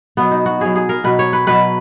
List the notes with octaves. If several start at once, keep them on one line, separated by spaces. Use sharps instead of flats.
B2 F#3 B3
D#4
F#4
B2 F#3 G#4
G#4
A#4
B2 F#3 B4
C#5
B4
B2 F#3 B4